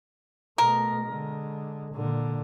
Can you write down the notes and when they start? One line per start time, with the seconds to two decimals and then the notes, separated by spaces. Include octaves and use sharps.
0.58 B2 A3 A#4
1.03 D3 G#3
1.93 A#2 D3